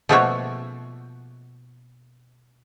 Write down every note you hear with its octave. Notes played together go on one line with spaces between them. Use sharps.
B2 F3 A3 A#3 F#4 C#5